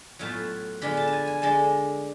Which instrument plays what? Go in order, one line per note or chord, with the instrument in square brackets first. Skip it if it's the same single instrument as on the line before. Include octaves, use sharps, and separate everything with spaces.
[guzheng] A2 F#3 B3 F4 A5
D3 G#3 B3 F4 B5
A5
A5
G#5
G#5
D3 G#3 A5